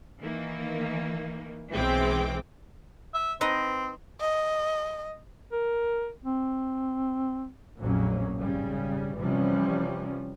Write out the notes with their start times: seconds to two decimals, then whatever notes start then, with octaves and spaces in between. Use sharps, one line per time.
0.21 D#3 E3 A#3
1.71 B1 E3 G#3 C4 G5 D6
3.14 E5
3.41 C4 D#4 B4 D#5
4.21 D#5
5.52 A#4
6.24 C4
7.80 A#1 F2 A2 F#3 A#3 C#4
8.35 G#1 C#3 G3
9.17 C3 E3 F3 G3 C#4